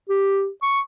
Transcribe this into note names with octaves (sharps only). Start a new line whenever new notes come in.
G4
C#6